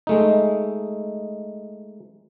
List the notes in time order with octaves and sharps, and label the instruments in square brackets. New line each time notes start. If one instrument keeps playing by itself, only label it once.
[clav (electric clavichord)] G#3 A3 D#4